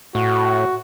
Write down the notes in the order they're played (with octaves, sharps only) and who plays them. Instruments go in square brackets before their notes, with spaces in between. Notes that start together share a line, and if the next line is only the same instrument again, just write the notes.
[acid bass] A2 [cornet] F#4